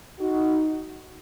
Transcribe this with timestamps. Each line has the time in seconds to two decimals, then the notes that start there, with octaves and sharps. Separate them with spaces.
0.19 D#4 F#4